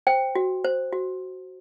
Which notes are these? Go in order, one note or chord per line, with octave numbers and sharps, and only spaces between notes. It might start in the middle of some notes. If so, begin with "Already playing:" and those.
C5 G5
F#4
C5
F#4